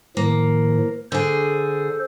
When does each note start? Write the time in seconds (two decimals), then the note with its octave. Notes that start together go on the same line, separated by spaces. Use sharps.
0.17 A2 D#3 F3 A#3
1.12 D3 G#4 A4 C5